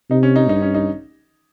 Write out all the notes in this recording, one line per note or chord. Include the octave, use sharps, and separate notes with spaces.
C3 D#4
C#4
D#4
G2 D#4
C#4
D#4